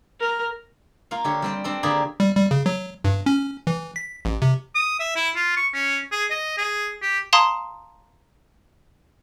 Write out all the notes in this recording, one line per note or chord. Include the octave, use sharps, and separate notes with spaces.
A#4
A#3 F4 F5
D3 G4 C#5
G3 C4 G5
C4 D4 A4
D3 A#3 G4 G#4 D5 B5
G3
G3
C#3
F#3
G2
C#4
E3
B6
A1
C3
D#6
E5
E4
F4
C#6
C#4
G#4
D#5
G#4
G4
F5 A5 A#5 C6 D#6